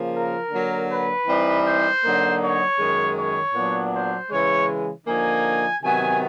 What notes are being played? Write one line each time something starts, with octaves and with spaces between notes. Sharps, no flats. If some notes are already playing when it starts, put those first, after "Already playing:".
Already playing: C#3 F3 A#3
A#4
D3 F#3 A#3
B4
E3 G3 C4 D#4
C5
D3 F#3 A#3 D#4
C#5
F#2 D#3 G#3
C#5
A#2 F#3 B3 D4
C5
C#3 E3 G#3 C#5
D3 F3 A#3 D#4 G#5
C3 D#3 F#3 B3 G#5